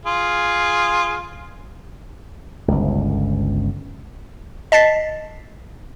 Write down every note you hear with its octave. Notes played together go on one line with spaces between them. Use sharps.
F4 G#4
G1 C#2
D#5 A5 A6 B6 C7